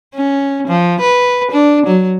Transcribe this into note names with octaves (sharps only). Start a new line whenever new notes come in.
C#4
F3
B4
D4
F#3